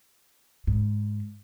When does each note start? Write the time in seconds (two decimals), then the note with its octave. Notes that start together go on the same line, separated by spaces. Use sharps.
0.67 G#2